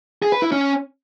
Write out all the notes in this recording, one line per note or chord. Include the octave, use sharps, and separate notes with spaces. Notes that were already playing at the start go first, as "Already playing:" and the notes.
G#4
B4
E4
C#4